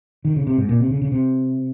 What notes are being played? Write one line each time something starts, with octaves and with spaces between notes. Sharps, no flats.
D#3
C#3
C3
G#2
A#2
C3
C#3
C#3
C3